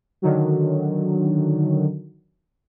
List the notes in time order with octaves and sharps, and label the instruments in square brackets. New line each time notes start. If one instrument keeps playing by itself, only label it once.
[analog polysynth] D3 D#3 F#3